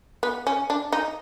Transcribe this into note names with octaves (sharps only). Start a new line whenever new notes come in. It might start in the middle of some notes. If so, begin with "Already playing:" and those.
B3
C#4
D4
D#4